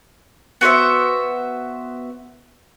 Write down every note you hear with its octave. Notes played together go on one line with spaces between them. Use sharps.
B3 F#4 C5 E5